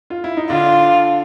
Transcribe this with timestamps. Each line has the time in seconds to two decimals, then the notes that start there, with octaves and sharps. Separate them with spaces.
0.10 F4
0.24 E4
0.37 D#4
0.50 D3 D4 F4